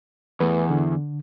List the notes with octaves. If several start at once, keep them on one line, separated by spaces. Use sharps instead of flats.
E2 A3 B4
D3